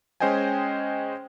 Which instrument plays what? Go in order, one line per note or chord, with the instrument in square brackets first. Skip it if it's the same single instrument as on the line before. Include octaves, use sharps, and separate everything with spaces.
[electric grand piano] G#3 C#4 C5 D#5 G5 G#5